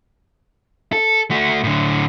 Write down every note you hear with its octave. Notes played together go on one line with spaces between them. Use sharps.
A4
A3 F#4
A2 D3